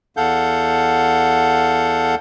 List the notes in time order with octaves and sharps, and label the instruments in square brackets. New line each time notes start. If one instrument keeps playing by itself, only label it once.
[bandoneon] E2 A4 F5 F#5 G6